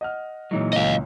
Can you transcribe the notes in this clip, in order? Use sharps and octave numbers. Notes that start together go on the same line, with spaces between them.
D#5 F#5 F6
A#2 E3 F#3 G#3 D#4 C#5
C#2 C#3 D#5 F5